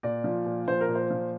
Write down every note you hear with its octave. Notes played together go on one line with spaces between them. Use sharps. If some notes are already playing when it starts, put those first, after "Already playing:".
A#2 D5
F3
A#2
F3 C5
A#4
A#2
C5
F3